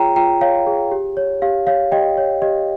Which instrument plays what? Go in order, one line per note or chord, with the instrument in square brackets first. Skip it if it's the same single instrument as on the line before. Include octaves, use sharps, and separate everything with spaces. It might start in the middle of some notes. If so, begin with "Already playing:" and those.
Already playing: [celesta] F4 G#4 C#5 G5 A#5
F4 G5 A#5
C#5 F5
G#4
G4
C#5
G4 F5
C#5 F5
G4 D#5 G5
C#5
G4 D#5